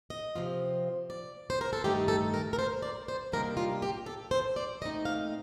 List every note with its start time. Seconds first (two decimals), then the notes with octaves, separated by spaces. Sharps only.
0.10 D#5
0.36 C3 F3 C4 F4
1.10 D5
1.50 C5
1.61 A#4
1.73 A4
1.84 G2 D#3 A3 D#4 G4
2.08 A4
2.34 A#4
2.53 A#4
2.59 C5
2.82 D5
3.08 C5
3.32 C3 D#3 G3 A#3 D4 A#4
3.57 F4
3.82 G4
4.06 A4
4.31 C5
4.56 D5
4.81 A#2 A3 C4 D#4 D#5
5.05 F5